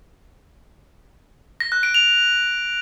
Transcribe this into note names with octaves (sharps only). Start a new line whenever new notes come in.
A#6
F#6
D7
F7